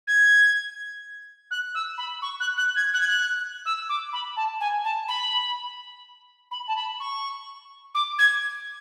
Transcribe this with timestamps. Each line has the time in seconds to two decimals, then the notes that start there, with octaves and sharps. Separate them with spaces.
0.07 G#6
1.50 F#6
1.74 E6
1.97 B5
2.22 C#6
2.40 F#6
2.57 F#6
2.76 G#6
2.93 F#6
3.00 G#6
3.08 F#6
3.65 E6
3.89 D6
4.12 B5
4.36 A5
4.60 G#5
4.84 A5
5.08 B5
6.51 B5
6.67 A5
6.76 B5
7.00 C#6
7.94 D6
8.18 G#6